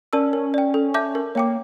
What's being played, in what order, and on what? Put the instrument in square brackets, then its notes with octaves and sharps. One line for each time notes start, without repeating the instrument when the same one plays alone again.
[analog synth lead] C#4 [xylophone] A#4 D5 A5 E6
[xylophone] A#4
D5 G5
A4
E5 A5 D6 G6
A#4
[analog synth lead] A#3 [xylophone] C#5 G5 D6